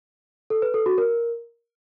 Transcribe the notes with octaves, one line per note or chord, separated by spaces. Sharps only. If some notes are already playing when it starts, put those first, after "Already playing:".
A4
B4
A4
F#4
A#4